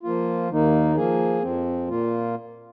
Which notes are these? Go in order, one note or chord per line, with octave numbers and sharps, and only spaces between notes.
F3 A#3 F4
D#2 D#3 A#3 D#4
F3 A#3 G#4
F2 F3 C4
A#2 A#3 F4